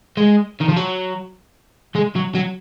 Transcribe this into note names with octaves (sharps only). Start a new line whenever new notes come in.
G#3
D#3
F3
F#3
G#3
F#3
F#3